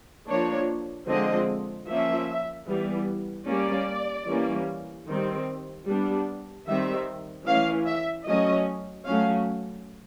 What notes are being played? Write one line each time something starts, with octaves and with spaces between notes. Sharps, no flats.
F3 A#3 D4 C#5
D3 F3 G#3 C4 D#5
F3 A#3 C#4 E5
E3 G3 B3
G3 A#3 C#4 D5
E3 G3 A#3 C#4
D#3 G3 C4
G3 B3 D4
D#3 G3 C4 E5
E3 A3 C#4 F5
E5
F#3 A3 C#4 D#5
F#3 A3 C#4 F5